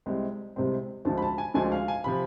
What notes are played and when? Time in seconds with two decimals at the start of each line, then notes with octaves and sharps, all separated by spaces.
0.06 C2 C3 G#3 C4
0.56 C2 C3 G#3 C4
1.05 D2 D3 F3 G#3 A5
1.18 B5
1.22 A5
1.38 G#5
1.54 D2 D3 F3 G#3 G#5
1.72 F5
1.88 G#5
2.04 C3 F3 B5